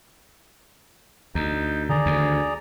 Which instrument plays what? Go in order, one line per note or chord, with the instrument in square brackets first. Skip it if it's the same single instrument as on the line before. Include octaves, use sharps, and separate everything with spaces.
[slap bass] D2 [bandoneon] D#4 G6
[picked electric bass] D3 D#3 [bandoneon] G#4 D5 A#5
[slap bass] D2